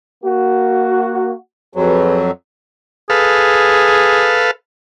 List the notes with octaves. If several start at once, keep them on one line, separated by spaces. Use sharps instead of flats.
A#3 F#4
F2 F#3 F#4 G#4 B4
G#4 A4 B4 F5